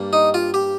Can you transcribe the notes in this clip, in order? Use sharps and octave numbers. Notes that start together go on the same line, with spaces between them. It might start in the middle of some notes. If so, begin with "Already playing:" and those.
Already playing: G2 G3 A#3
D#4
F4
G4